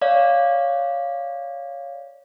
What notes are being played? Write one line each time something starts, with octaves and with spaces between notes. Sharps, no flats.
C#5 D5 F5